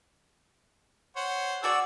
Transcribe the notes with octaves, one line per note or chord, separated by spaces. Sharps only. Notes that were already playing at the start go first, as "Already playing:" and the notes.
C5 C#5 F#5
D4 F#4 G#4 D5 E6